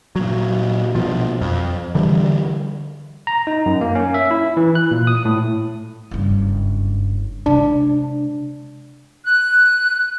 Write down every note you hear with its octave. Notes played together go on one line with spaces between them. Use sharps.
A#2 F#3
B2 F3
F2
D3 E3 G3
A#5
D#4
F#2
A#3
C#4
E5
E4
E3
F#6
A#2
D#6
A2
F#1 G2
C3 G#3 D4
F#6